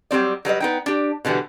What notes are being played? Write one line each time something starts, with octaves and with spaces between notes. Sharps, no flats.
F#3 G3 C4 D5
F#3 G3 B4 D#5
B3 D#4 G5
D4 G4
B2 D3 E3 G3 B3